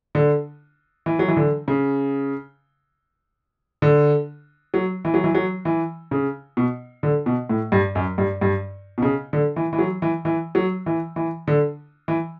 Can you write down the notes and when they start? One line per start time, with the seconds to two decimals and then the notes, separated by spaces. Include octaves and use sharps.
0.15 D3
1.06 E3
1.19 F#3
1.28 E3
1.37 D3
1.68 C#3
3.82 D3
4.74 F#3
5.05 E3
5.14 F#3
5.24 E3
5.35 F#3
5.65 E3
6.11 C#3
6.57 B2
7.03 D3
7.26 B2
7.49 A2
7.72 G2
7.95 F#2
8.18 G2
8.41 G2
8.98 B2
9.02 C#3
9.33 D3
9.56 E3
9.73 E3
9.79 F#3
10.02 E3
10.25 E3
10.55 F#3
10.86 E3
11.16 E3
11.48 D3
12.08 E3